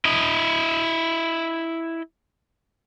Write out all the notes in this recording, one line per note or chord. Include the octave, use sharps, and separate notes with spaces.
E4 D#5